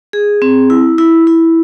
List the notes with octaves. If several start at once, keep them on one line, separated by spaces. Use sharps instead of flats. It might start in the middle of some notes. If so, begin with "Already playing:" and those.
G#4
C4
E4
E4
E4